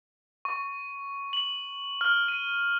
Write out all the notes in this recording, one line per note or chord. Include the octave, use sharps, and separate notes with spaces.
C#6
F#7
F6
D#7